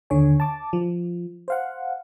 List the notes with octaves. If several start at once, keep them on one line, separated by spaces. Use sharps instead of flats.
D#2 D3 C#5 G#5
A5 D6
F3
C5 F5 F#5